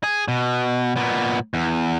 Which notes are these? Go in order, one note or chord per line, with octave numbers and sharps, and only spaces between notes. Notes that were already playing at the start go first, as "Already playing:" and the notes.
G#4
B2
A#2 B3
E2